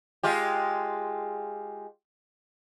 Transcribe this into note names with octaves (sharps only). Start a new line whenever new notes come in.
G#3 F4 G4